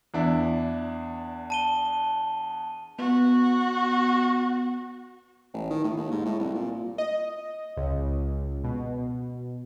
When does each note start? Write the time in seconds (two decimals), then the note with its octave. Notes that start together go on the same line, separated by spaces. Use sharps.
0.14 E2 D4 E4
1.50 A5 D#7 G7
2.99 B3 F#4
5.54 A1
5.70 D#3
5.84 A2
5.97 D#2
6.12 G#2
6.25 A2
6.39 C2
6.54 A#2
6.98 D#5
7.77 C#2
8.64 B2